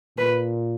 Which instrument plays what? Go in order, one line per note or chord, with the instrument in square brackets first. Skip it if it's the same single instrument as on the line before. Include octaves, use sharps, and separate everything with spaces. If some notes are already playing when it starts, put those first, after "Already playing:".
[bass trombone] A#2 [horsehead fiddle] B4